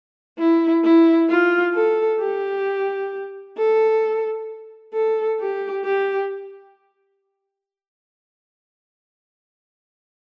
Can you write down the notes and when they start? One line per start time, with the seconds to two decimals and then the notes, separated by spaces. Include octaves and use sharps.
0.39 E4
0.84 E4
1.29 F4
1.74 A4
2.21 G4
3.58 A4
4.93 A4
5.40 G4
5.85 G4